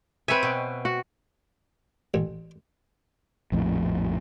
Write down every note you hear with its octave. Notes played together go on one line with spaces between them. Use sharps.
C4 B4 C#5 E5 G#5
B2
F#4
A1
A#1 F2 A2